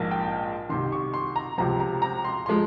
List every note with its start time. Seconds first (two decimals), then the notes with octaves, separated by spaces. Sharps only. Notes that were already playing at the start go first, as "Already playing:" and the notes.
Already playing: A#1 G#2 F3 A#3
0.11 G5
0.69 C2 C3 D#3 C6
0.92 C#6
1.14 C6
1.36 A#5
1.58 C#2 C3 F3 C4 A#5
1.80 A#5
2.02 A#5
2.24 C6
2.46 F3 G#3 C6